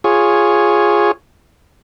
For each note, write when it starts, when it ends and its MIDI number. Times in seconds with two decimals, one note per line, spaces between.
0.04 1.11 65
0.04 1.11 68
0.04 1.11 73